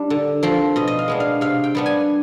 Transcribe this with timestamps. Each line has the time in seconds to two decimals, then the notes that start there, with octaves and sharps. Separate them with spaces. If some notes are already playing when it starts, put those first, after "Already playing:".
Already playing: G3 D4
0.10 D3
0.43 F3 C4
0.76 B2 D#5
0.88 D#5
0.99 F5
1.08 G#3 B3 D4
1.20 F5
1.41 C3 F5
1.64 G5
1.75 G3 B3 D4
1.86 G#5